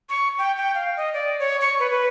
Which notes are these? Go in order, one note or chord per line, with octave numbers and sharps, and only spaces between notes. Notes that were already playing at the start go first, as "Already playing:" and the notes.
C#6
G5
G5
F5
D#5
D5
C#5
C#6
B4
B4